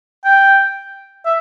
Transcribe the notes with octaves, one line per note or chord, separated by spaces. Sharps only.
G5
E5